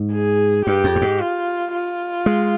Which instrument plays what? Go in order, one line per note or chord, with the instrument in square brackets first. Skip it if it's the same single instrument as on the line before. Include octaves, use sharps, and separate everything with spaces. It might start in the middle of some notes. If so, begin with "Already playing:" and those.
Already playing: [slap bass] G#2
[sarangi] G#4
[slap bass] G2 [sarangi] G4
[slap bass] F2
G2
G#2
[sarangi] F4
F4
[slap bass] G#3